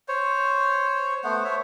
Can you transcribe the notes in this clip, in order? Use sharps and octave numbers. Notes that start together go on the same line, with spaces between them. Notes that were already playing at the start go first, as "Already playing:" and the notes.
C5 C#5
A3 B3 C5 F#5
C5 C#5 E5